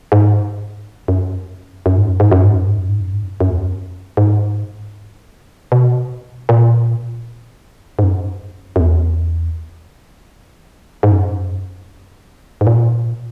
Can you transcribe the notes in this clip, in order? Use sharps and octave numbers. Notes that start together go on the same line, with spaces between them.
G#2
F#2
F#2
G#2
F#2
G#2
F#2
G#2
F#2
G#2
F#2
G#2
F#2
G#2
F#2
F#2
E2
F#2
G#2
B2
A#2
G#2
F#2
F#2
E2
G#2
F#2
G#2
A#2